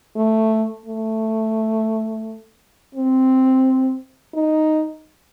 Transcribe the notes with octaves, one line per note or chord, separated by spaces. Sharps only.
A3
A3
C4
D#4